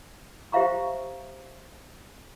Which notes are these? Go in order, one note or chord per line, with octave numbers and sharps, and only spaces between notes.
G4 C5 E5 F5 A#5 C#6